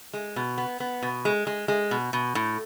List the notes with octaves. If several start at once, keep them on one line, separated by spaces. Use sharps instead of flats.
G#3
B2
B3
B3
B2
G#3
G#3
G#3
B2
B2
A2